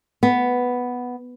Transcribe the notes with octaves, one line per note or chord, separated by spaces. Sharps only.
B3